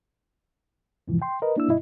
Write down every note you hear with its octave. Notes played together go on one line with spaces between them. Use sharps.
E2 G#2 C3 E3 F3
G5 C6
A#4 B4 D#5
A#3 D4 E4 E6
G2 B2 E4 D#5